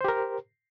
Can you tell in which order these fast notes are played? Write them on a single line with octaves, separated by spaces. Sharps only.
C5 G4 A#4